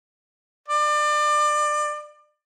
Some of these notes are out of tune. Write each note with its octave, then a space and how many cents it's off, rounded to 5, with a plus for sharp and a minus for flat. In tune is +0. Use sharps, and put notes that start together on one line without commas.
D5 +30